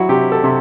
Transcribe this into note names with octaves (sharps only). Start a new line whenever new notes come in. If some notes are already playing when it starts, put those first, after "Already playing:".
Already playing: F#3 E4 F#4
C3 G4
A4
C3